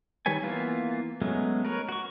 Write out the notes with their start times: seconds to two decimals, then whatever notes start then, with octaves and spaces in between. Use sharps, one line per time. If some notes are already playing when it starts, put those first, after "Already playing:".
0.26 D#3 G3 B4 C#5 G#5
0.43 E3 A#3 B3 F4
1.22 F#3 G#3 A3 B3 C#4
1.65 A#4 B4 C#5
1.89 F#4 C#6